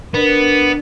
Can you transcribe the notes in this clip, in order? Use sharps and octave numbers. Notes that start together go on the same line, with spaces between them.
B3 D4 A#4